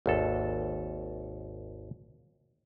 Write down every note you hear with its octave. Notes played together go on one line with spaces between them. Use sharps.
G#1 D#2 A4